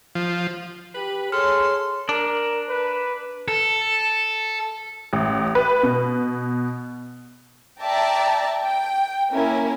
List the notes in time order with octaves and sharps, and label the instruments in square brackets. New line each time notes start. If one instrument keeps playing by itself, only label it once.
[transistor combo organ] F3
[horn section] G4 B4
[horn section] G#4 A4 [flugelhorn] C#5 [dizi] C6 [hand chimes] F6
[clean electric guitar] D4 [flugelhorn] A#4
[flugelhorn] B4
[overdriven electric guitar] A4
[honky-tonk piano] A1
B4
B2
[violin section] D5 E5 G5 A5 A#5
G5
A#3 C#4 E4 A#4